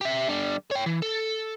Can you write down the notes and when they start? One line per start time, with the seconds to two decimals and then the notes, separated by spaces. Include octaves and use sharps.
0.01 G4 E5
0.28 D3 G3
0.71 C#5 G5
0.86 E3
1.02 A4